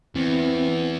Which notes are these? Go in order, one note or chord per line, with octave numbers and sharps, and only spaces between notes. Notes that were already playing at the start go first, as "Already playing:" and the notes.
E2 E3 C4